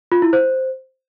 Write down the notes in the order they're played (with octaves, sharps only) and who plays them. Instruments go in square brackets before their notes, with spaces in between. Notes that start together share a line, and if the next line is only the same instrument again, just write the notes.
[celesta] F4
E4
C5